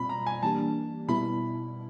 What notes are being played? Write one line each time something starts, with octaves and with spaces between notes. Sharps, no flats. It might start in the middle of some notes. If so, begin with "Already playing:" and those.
Already playing: B2 G3 C4 F4 B5
A#5
G#5
E3 G3 A#3 D4 G4 A5
B2 G3 B3 E4 B5